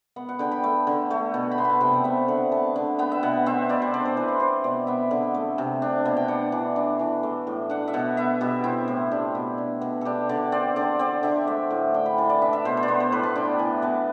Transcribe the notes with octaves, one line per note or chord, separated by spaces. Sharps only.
B3 F#5
F#5
D3 G5
B5
A3
D3
A3
B2
B5
B3 C6
B5
A5
C3 G5
F#5
B3 E5
D3 F#5
B3 A5
D3
B3 G5
E5
B2 F#5
C4 E5
B2 D5
C5
D4 D5
C5
E3 B4
C5
C4 C5
B2 D5
B3 E5
D3
A3
C3
D4
B2
G5
D4 F#5
E3
D4
E3
A3
A2
D4 F#5
E5
B2 F#5
B3 E5
B2 G4
C4 E4
A2
D4 G4
B2
D4
B2
D4 G4 A4
D3 D5
C4 D5
D3 D5
C4 D5
D3 E5
A3 E5
A2
D4 G5
B5
E3 A5
D5
D4 E5
E5
B2 C5
C5
D5
B3 C5
C5
A2 B4
A5
D4 G5
E3
B3 A5